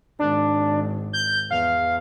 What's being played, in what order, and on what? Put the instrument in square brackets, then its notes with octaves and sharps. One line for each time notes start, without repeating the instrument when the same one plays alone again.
[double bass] G#1 [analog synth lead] D4
[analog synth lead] G6
[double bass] E2 [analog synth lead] F5